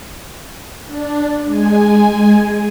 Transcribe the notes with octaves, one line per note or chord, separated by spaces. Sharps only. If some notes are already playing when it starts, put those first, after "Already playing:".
D4
G#3 G#5